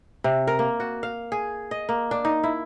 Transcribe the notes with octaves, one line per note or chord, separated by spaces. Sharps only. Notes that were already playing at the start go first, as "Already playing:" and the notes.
C3
A#4
A#3
F#4
F5
G#4
D#5
A#3
D4
D#4
E4